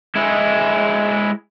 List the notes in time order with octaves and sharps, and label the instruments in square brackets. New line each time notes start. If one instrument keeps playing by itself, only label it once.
[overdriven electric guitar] G#3 E4